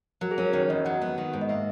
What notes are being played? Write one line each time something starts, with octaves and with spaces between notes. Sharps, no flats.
F#3 A#4
G#4
C#4 A#4
D#3 C#5
E2 D#5
F#3 F#5
B3
D#3
G#2
D#5
A#3 E5